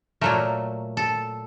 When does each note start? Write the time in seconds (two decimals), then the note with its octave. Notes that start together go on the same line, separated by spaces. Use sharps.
0.21 A#2 F#3 A3 A#4
0.97 A4